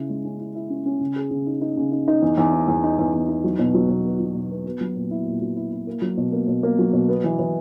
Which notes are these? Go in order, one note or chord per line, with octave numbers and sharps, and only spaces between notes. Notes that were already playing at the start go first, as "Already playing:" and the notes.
Already playing: C#3 E4
G#3
C#4
E4
E4
C#4
C#4
C#3
G#4
C#3
D#4
D#4
C#3
D#4
D#4
E2
E2
D#4
E2
D#4
E2
E2
D#4
F#3
B2
F#3
B2
B3
F#3
B2
B3
B3
F#3
A#2
E4
A#2
F#3
E4
E4
A#3
F#3
B2
A#3
B2
A#3
F#3
B2
B3
E3
E3